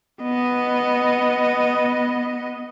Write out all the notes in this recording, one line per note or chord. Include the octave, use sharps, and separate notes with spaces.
B3 D#5